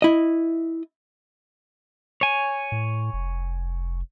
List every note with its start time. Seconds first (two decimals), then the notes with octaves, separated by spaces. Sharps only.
0.02 E4 D#5
2.21 C#5 G#5
2.72 A2
3.13 F1